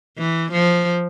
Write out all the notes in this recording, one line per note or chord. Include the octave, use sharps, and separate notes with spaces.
E3
F3